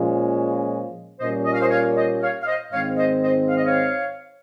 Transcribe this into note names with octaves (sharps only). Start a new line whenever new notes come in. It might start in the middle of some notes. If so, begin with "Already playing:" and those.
Already playing: A#2 F3 G#3 C#4 F4
A#2 G3 A#3 C#4 F4 C5 D#5
D#5
F5
C5 D#5
C#5 F5
C5 D#5
C#5 F5
F5
C5 D#5
G#2 D#3 G#3 C4 C#5 F5
C5 D#5
C5 D#5
F5
D#5
C#5 F5